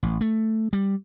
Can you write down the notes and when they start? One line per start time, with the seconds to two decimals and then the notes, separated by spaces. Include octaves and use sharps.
0.03 A1
0.21 A3
0.73 G3